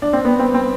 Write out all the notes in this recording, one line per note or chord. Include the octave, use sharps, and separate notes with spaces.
D4
C4
B3
C4
C4